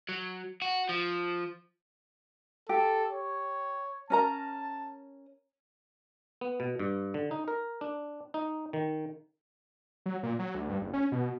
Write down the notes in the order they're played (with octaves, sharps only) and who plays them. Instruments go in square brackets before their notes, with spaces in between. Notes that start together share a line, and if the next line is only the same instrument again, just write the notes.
[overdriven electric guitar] F#3
F#4
F3
[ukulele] G4 [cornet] A4
[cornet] C#5
[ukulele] C#4 A#4 A#5 [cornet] A5
[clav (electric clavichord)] B3
B2
G2
D3
D#4
A#4
D4
D#4
D#3
[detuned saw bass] F#3
A#2
F#3
D2
G2
F#1
C#4
B2